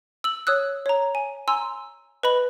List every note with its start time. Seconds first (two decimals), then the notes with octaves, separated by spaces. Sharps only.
0.24 E6 F#7
0.47 C#5 D#6 E6 F#6
0.86 C#5 A#5
1.15 G#5
1.48 G#5 A#5 C6 E6
2.23 B4 D#5 B5 F#7